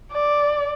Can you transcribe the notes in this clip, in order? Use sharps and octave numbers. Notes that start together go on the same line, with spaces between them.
D5